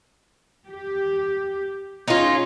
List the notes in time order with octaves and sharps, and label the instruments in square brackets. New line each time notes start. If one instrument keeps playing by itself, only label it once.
[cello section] G4
[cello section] C#4 G#4 C#5 [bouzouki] D#4 F4